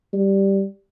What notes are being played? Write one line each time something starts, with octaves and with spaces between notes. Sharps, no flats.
G3